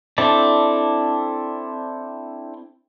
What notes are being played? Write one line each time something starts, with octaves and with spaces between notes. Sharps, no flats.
C4 D4 E4 A4 D5